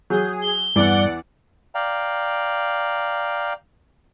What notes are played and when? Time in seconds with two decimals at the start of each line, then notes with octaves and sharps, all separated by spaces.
0.10 F#3 G#4 G6
0.41 G7
0.76 E2 G2 E3 D5 F#5
1.74 D5 F5 G5 A#5